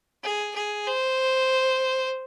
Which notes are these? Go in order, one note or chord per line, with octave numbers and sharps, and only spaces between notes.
G#4
G#4
C5